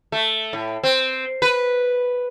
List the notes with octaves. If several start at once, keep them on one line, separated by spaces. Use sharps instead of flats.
A3
A2
C4
B4